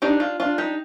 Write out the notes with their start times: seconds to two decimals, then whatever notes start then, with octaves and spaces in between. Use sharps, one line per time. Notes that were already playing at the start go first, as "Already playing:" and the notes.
0.02 D4 D#4 G4
0.20 F4
0.40 D4 F4
0.58 D#4 G4